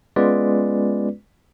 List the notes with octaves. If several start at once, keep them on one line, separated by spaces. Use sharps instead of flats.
G#3 B3 C#4 F4 B4 D5